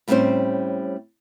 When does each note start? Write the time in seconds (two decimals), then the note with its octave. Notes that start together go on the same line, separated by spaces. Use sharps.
0.08 A2 G3 G#3 C4 C#4 C5